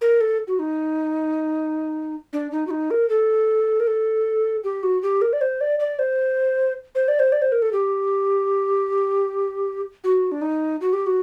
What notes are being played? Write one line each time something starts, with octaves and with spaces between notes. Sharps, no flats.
A#4
A4
F#4
D#4
D4
D#4
F#4
D#4
A#4
A4
A#4
A4
G4
F#4
G4
A#4
D5
C5
D5
D5
C5
C5
D5
C5
D5
C5
A#4
A4
G4
F#4
D4
D#4
F#4
G4
F#4